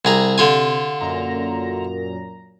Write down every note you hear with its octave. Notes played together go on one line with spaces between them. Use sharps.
C2 C3 G#4 A#5
D3 F4 G#5
F#2 A#2 A#5